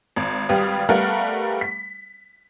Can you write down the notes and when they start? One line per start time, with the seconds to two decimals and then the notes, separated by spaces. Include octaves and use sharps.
0.16 G#1
0.49 G#1 G3 G4 B4 F5 D#6
0.89 G3 A3 B3 A#4 F5 F#5
1.61 B6